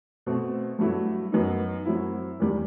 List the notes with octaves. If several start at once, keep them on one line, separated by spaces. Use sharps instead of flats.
B2 A3 C4
G2 F#3 A3 E4
F#2 F#3 B3 D#4
F#2 F#3 C4 E4
E2 D#3 G3